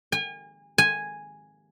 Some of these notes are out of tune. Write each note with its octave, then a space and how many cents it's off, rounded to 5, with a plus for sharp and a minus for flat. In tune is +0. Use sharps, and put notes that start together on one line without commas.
G#5 -35
G#5 -5